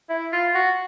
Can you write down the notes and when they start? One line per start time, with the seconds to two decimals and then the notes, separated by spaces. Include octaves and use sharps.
0.10 E4
0.32 F4
0.54 F#4